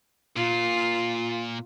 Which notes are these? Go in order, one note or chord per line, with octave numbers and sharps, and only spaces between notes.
A#2 F4